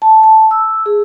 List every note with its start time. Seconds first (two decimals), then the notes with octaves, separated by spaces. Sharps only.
0.02 A5
0.23 A5
0.51 E6
0.86 G#4